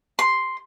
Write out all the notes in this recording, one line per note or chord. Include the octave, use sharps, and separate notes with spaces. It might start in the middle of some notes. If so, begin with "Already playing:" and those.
C6